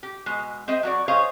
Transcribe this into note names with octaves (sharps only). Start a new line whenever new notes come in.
G4
B2 G#3
C4 C5 D#5 E5
F#3 F#4 D5
G#4 C5 C#5 D#5 F5